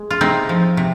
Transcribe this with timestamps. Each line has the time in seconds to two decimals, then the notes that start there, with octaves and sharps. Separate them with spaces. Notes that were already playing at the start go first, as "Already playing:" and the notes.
Already playing: G#3
0.11 F4
0.21 C3 C4 D#4
0.49 F3
0.77 C3